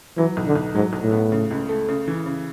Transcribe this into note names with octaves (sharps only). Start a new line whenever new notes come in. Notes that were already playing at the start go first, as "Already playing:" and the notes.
E3 F#3
B1
D3
B1
G#2 F#3
B1
A2
B3
C#3
C#2
A3
C#3
E3
C#3